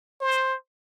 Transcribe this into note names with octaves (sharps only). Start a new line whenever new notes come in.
C5